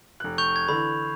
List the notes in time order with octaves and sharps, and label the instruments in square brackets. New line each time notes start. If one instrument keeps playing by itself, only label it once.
[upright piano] F1 F#6
[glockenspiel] C#6 G6 F7
G#6
[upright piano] D3 E3 [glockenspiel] B5